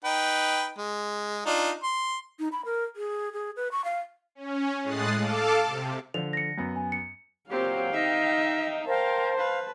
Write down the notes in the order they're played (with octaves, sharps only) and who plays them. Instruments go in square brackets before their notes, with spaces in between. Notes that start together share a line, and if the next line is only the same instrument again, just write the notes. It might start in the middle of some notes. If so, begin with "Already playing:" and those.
[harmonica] D#4 B4 G5
G#3
D4 D#4 F4
C6
[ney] D#4
B5
A#4
G#4
G#4
B4
C#6
F5
[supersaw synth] C#4
A2 G#3 D#6 F#6 A6 C7
A4 F5 A5 D6
C3
[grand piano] D3 F3 [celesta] F7
[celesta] A#6 C#7
[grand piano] F#2 B3
[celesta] G#5
C#7
[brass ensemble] A#2 F#3 [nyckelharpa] C4 G4 [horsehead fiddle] F5 G5
[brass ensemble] D#4 [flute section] D#5 [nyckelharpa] E5
[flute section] A#4 F5 G5 [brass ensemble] C5 [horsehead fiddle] A5
[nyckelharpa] B4 [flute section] F5